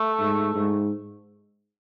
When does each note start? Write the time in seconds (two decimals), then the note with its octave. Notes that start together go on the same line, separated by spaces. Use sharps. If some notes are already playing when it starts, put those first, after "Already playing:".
Already playing: A3
0.20 G#2
0.54 G#2